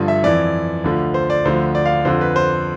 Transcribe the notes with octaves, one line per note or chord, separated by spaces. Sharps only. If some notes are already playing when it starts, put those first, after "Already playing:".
Already playing: G2 D3 F3
E5
F2 E3 D5
D2 D3 F3
C5
D5
D2 D3 F3 C5
D5
F5
F2 D3 F3 C5
B4
C5